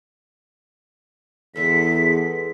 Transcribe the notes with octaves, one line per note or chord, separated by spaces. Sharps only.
E2 G#3 A4 B6